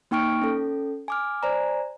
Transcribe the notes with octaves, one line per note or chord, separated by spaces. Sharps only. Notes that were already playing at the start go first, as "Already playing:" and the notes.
A#3 D#4 G5 C#6 F6 D7
C#4 A4
G#5 D6 F6
C5 D5 G#5 A#5